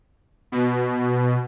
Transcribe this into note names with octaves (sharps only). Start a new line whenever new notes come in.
B2